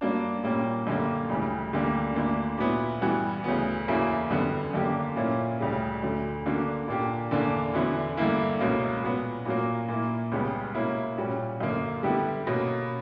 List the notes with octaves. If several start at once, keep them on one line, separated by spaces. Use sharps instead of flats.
G2 F#3 A#3 D4
A#2 G3 A#3 C#4
F#2 D3 G3 A#3
D2 C#3 E3 G3
D2 D3 G3 A#3 D4
D2 D3 A#3 D4
A#2 F#3 B3 E4
G2 E3 G3 B3 F#4
D2 C#3 F#3 B3
E2 C#3 F#3 A#3 E4
F#2 D3 G3 B3
F#2 D3 A#3 D4 G4
A#2 A#3 C#4 E4
D2 C#3 G3 C#4
D2 D3 F#3
D3 A#3 D4 F#4
A#2 A#3 D4 G4
E2 D3 A#3 D4
E2 D3 F#3 B3 E4
G2 D3 A#3 E4
C#2 B2 A#3 C#4
A#2 F#3 B3
A#2 F#3 A#3
A#2 A#3 E4
C#2 C#3 G3 B3
B2 A#3 C#4 E4
A#2 G3 C#4 F#4
F#2 D3 A#3
D3 G3 B3 E4 G4
B2 A#3 C#4